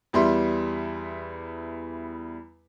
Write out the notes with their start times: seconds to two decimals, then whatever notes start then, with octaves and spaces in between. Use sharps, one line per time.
0.13 E2 G3 E4 C6